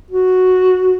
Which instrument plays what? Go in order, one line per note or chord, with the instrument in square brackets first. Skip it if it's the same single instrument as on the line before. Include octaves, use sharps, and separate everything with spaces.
[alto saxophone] F#4